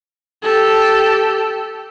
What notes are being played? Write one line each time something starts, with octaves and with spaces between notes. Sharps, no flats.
G4 A4